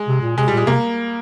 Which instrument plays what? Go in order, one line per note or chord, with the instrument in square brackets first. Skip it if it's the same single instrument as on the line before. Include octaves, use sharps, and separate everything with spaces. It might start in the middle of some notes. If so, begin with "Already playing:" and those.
Already playing: [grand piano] G#3
[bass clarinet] C3
A#2
[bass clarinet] C3 [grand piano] G#3
[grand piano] G3
[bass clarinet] A#2 [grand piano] G#3
[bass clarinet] C3 [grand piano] A#3